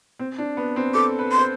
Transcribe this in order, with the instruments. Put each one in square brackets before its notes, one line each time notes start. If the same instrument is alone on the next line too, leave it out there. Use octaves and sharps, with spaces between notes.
[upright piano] C4
D4
B3
C4
[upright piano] A4 [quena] D6
[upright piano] B4
[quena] C6
[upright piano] C5